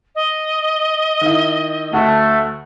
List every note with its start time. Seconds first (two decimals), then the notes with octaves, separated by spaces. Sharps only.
0.15 D#5
1.21 D#3 E4
1.93 D2 A3 F#4